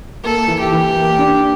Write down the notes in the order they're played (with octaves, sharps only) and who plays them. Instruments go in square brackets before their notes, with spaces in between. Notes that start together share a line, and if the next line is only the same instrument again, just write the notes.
[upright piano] A#3 [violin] A4
[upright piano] E3
[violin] G4
[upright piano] E3
A#3
D4